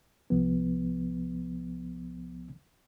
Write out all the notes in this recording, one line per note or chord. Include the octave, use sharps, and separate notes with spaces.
C2 F3 B3